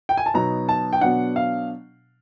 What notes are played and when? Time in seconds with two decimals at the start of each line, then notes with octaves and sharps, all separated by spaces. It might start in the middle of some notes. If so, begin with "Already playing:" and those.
0.09 G5
0.17 G#5
0.26 A5
0.34 B2 F#3 B3 D#4 A#5
0.69 A5
0.93 G5
1.01 B2 F#3 B3 D4 F#5
1.36 F5